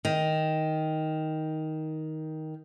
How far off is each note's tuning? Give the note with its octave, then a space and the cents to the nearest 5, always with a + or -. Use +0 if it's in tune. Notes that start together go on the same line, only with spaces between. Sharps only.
D#3 +10